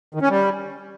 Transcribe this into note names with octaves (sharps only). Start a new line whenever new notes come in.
D#3
C#4
G3